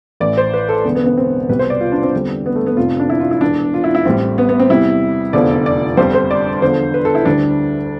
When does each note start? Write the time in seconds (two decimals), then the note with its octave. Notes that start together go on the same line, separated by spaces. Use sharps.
0.20 A1 A2 E3 D5
0.37 C5
0.53 B4
0.69 A4
0.84 E1 E2 D3 B3
0.95 B3
1.06 B3
1.17 C4
1.49 C2 B2 G3 B4
1.59 C5
1.70 D5
1.81 F4
1.92 D4
2.03 C4
2.13 E2 D3 G3
2.46 B3
2.56 A3
2.66 B3
2.77 F1 F2 C3 F3 F4
3.00 D4
3.10 E4
3.20 F4
3.31 E4
3.41 E1 E2 B2 D4
3.74 F4
3.84 E4
3.95 E4
4.05 A1 A2 G3 C4
4.38 B3
4.49 B3
4.60 C4
4.69 E2 C3 G3 E4
5.33 F1 E2 D3 F3 D5
5.66 D5
5.97 G1 F2 D3 G3 C5
6.14 C5
6.31 D5
6.62 E2 D3 F3 C5
6.94 B4
7.05 A4
7.15 E4
7.25 D2 D3 G3 D4